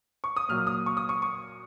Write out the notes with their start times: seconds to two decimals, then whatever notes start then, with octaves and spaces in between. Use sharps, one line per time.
0.24 C#6
0.36 D#6
0.48 A#2 F#3 A#3 F6
0.67 D#6
0.86 C#6
0.97 D#6
1.09 C#6
1.22 C#6